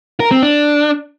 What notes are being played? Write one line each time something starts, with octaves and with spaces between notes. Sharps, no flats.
A#4
C4
D4